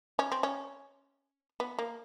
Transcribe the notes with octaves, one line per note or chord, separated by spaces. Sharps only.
C#4
C4
C#4
B3
A#3